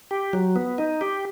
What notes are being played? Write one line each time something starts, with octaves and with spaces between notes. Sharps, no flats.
G4
F#3
B3
D#4
G4